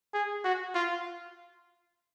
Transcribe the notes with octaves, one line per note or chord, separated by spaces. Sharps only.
G#4
F#4
F4